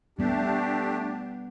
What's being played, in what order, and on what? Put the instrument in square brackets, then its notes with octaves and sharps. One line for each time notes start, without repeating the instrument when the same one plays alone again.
[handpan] G3 B3 [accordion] A3 D4 G4